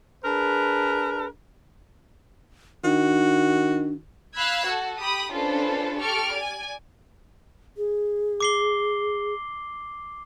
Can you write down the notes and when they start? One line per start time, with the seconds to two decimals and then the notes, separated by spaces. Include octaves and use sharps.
0.24 D4 G#4 A#4 B4
2.84 D#3 D4 F#4
4.34 F5 B5 E6 F#6 G#6
4.65 F#4 A4
4.99 G4 B5 D#6
5.31 C#4 D4 F4 A4 B4 C5
5.98 G4 A4 C#6 F6 D7
6.34 D5 G#5
7.77 G#4
8.40 D6 C7 G7